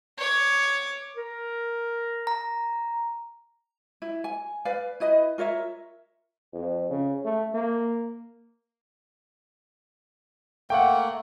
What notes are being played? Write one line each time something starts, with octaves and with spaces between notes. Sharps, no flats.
C#5 D6
A#4
A#5
E4
G#5
B4 D5 F5
E4 B4 D#5 B5
F4 A#4 C#5 E5
F2
C#3
A3
A#3
A3 A#3 F#5 G5